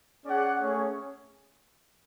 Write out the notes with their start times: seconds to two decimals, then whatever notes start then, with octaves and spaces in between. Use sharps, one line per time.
0.24 C#4 G#4 D5 F#5
0.58 A3 C#4 G#4 C#5